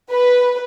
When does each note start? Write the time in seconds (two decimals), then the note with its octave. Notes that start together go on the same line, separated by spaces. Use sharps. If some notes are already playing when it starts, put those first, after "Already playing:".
0.11 B4